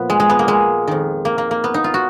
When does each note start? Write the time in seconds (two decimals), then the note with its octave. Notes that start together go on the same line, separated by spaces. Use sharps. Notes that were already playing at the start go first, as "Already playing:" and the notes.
Already playing: A#2 F3 B3
0.10 G#3
0.20 G#3
0.29 B3
0.39 A#3
0.48 G#3
0.87 F2 D#3
1.25 A#3
1.38 A#3
1.51 A#3
1.64 B3
1.74 D#4
1.84 F4
1.94 F#4